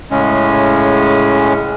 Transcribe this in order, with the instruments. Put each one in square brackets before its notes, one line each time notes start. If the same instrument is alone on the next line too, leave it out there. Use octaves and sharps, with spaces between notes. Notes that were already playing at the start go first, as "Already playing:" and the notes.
[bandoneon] A2 C#3 G#3 C#4